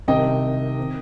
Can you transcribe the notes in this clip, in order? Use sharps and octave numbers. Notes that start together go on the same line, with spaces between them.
C2 C3 D#3 C4 D#5 G5
D#3 C4